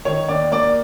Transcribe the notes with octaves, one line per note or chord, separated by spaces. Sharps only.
D#3 C#5
D#2 D5
A#3 D5